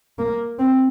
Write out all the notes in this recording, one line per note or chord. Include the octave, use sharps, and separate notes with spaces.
A#3
C4